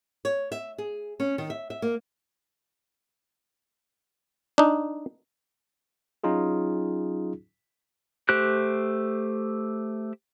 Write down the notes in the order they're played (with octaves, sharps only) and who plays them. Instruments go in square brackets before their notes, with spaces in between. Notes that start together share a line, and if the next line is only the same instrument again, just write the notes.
[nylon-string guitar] C#5
E5
G#4
C#4
D#3
E5
E5
A#3
[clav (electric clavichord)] D4 D#4
[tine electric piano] F#3 C#4 D#4 F4 G#4
[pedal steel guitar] A3 G4 C5 F#6